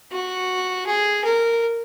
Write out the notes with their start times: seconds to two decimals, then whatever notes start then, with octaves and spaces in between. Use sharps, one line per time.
0.12 F#4
0.86 G#4
1.24 A#4